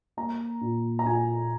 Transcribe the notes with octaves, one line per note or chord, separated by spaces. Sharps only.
A#3 A#5
A#2
A#5
A#2 G#5